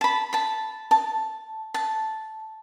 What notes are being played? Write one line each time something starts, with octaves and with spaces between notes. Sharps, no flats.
A5 B5
A5 B5
A5
A5